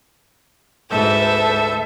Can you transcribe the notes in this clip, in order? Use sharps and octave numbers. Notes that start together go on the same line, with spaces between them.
D2 G#2 A4 B4 E5 E6 G6